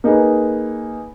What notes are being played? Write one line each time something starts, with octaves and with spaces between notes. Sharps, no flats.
A#3 D#4 G#4 B4